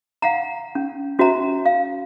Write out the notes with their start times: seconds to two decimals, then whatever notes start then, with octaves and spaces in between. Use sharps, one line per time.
0.22 F5 F#5 A#5
0.75 C#4
1.19 C#4 F#4 C5 E5 A#5
1.66 F5